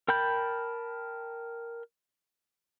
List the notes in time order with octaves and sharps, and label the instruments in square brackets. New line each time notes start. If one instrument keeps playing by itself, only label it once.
[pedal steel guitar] A#4 G5 A5 B5 G6